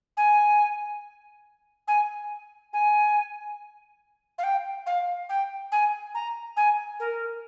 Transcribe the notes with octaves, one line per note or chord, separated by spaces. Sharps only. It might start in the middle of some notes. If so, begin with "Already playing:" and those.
G#5
G#5
G#5
F5
G5
F5
G5
G#5
A#5
G#5
A#4